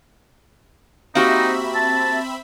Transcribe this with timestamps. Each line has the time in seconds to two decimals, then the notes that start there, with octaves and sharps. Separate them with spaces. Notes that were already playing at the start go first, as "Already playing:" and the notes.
1.15 A#3 C4 D#4 F#4 G4 E5 B5
1.75 A5